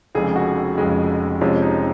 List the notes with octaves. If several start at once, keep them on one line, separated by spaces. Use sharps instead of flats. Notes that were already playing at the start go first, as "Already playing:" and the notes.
F1 F2 C#3 G#3 G#4
F#4
F1 F2 C#3 G#3
F2 C3 F3 G#3 C#4
D#4